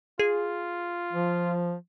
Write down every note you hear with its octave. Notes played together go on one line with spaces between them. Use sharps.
F4 G#4
F3